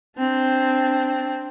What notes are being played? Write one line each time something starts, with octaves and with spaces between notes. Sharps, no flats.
C4 D4